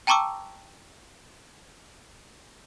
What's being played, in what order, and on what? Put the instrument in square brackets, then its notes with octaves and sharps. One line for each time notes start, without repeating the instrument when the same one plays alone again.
[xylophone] G5 A5 A#5 C#6 D6 E6